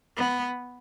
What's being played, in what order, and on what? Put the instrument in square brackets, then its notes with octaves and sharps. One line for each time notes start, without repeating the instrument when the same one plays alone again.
[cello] B3